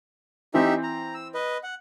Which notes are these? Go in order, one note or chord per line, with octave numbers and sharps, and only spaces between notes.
E3 C4 D#4 G4 E5
A#5
E6
B4 D#5
F#5